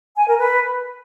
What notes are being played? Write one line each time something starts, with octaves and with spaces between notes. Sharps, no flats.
G#5
A#4
B4